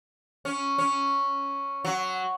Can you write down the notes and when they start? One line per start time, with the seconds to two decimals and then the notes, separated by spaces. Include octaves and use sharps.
0.45 C#4
0.78 C#4
1.85 F#3